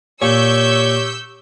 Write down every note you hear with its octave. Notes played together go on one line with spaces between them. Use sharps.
A#2 G4 C#5 C#6 E6 G6